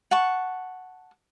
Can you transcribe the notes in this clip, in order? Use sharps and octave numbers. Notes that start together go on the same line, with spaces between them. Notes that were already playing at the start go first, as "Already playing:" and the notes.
F#5 A5 C#6